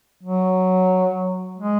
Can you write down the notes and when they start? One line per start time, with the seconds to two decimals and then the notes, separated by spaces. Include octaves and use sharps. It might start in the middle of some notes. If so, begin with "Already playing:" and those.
0.23 F#3
1.58 G#3